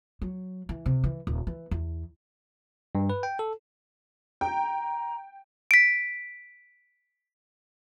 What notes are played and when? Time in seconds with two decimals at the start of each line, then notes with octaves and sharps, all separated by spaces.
0.22 F#3
0.69 E3
0.86 C3
1.04 E3
1.27 D#1
1.47 E3
1.71 E2
2.95 G2
3.10 B4
3.23 G5
3.39 A4
4.41 G5 A#5
5.71 B6 D7